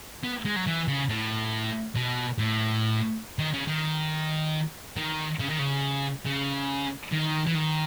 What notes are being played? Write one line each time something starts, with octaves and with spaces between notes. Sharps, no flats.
B3
G#3
F#3
E3
C#3
A2
B2
A2
D#3
C#3
D#3
D#3
C#3
D#3
C#3
C#3
D#3
E3
D#3